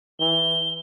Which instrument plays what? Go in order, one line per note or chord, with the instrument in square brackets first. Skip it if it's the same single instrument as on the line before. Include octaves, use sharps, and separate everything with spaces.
[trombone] E3 [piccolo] G7